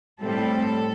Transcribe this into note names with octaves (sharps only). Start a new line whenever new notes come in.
A2 G3 C4 A4